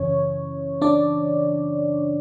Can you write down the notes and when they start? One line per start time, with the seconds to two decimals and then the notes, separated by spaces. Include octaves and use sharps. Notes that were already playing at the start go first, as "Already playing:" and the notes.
Already playing: F#2 C#3 E3 C#4 C#5
0.82 D4 D5